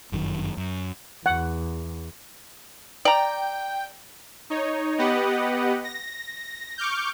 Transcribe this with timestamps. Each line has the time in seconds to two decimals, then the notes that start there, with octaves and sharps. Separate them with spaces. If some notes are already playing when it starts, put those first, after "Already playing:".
0.12 G1 F#2 D#3
0.57 F#2
1.26 E2 F#5
3.05 D5 G5 A#5
4.50 D#4 C#5
4.98 B3 G4 B4 D#5 F#5
5.84 A#6
6.78 C#6 D6 F6 G6